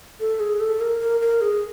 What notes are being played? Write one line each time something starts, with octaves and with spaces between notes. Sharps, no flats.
A4
G#4
A4
A#4
A#4
A#4
G#4